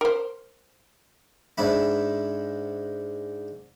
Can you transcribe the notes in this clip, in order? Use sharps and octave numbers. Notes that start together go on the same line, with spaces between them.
A#4 C5
G#2 D4 E5 B5